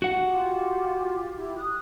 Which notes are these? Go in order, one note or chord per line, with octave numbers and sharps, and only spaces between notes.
F#4 F#5
F4 G4
E4 G4
D#6 F#6